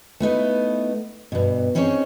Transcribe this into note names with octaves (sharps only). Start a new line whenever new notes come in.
A3 B3 D#4 E4
G2 B2
C4 C#4 D#4 G#4 B4 C#5